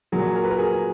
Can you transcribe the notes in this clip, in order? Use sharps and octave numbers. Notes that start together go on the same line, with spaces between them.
A#2 F#3 A#3 G#4
A#4
B4
A#4
G#4